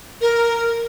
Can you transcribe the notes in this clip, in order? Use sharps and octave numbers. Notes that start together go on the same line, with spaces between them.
A#4